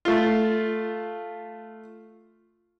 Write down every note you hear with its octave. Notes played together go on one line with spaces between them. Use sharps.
A3 F4